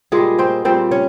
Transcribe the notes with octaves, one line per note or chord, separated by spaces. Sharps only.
A#2 G3 G#3 G#4
C4 C5
A#2 G3 C4 C5
C#4 C#5